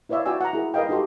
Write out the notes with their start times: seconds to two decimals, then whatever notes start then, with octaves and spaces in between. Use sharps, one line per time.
0.09 E4 B4 C#5 D5 E5 F5
0.25 F4 F#4 D5 G5 G#5 E6
0.41 F#5 A#5
0.53 E4 G#4 A#4
0.74 A#4 B4 D#5 F5 G5
0.89 D#4 F#4 G4 A4 C6